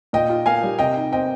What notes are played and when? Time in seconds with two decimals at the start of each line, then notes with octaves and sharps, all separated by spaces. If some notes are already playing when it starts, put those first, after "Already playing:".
0.13 A#2 D#5 G5
0.30 F4
0.46 A#3 F5 G#5
0.63 G3
0.79 C3 D#5 G5
0.96 D#4
1.12 C4 D#5 G5